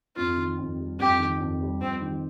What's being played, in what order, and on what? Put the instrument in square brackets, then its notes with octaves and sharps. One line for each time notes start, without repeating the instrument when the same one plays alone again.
[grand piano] F2 [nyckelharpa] F4
[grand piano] D#3
F2
G3
[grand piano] F2 [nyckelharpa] G4
[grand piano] D#3
F2
G3
[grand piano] F2 [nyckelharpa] C4
[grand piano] D#3